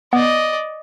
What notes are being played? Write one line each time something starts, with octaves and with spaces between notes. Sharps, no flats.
B3 D5 D#5